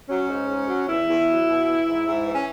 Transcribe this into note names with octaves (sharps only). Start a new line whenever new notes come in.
F#3 C#4
G#2
G#2
F#3
E2 E4
E2
F#3
B2
E3
G#2
G#2
E3
C#4